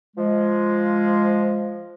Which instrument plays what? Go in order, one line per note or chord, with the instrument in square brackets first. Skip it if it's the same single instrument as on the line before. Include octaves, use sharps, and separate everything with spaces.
[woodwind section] F3 G#3